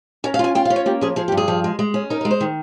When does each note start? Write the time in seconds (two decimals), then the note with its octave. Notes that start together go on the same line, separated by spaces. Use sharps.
0.24 C#4 A#4
0.34 F5
0.39 F4 G#5
0.55 F4 G5
0.65 F5
0.70 C#4
0.76 C#5
0.86 A#3 G4
1.01 F3 G#4
1.16 F3 G#4
1.28 G4
1.32 G2
1.37 G#4
1.48 F3
1.64 G#3
1.79 G#3
1.94 C#4
2.10 D#4 A#4
2.21 A#4
2.25 G#3
2.31 C5
2.40 D#3